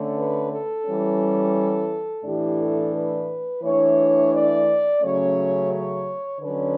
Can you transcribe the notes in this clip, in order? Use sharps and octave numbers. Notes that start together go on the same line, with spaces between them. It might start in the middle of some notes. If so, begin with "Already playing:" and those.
Already playing: D3 A3 C#4
B4
A4
E3 G3 C#4
A2 E3 A3 D4 G4
A4
B4
E3 A3 D4 C#5
D5
C#3 F#3 A3 C#4 C#5
C#5
D3 F#3 C#4 B4